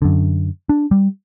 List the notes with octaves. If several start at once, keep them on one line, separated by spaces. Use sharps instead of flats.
F#2 D3
D4
G3